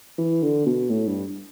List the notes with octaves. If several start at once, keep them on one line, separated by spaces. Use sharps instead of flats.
E3
D3
B2
A2
G2